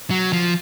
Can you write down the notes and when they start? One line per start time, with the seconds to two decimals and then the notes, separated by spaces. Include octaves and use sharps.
0.10 F#3
0.33 F3